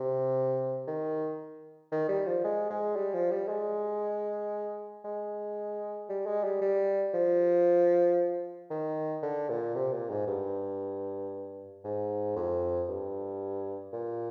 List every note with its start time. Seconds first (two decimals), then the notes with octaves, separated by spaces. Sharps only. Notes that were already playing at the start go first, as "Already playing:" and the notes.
Already playing: C3
0.87 D#3
1.92 D#3
2.09 G3
2.26 F3
2.44 G#3
2.70 G#3
2.96 G3
3.14 F3
3.31 G3
3.48 G#3
5.05 G#3
6.09 G3
6.26 G#3
6.44 G3
6.61 G3
7.14 F3
8.70 D#3
9.22 D3
9.49 A#2
9.75 C3
9.92 A#2
10.10 G#2
10.27 G2
11.84 G#2
12.36 F2
12.88 G2
13.93 A#2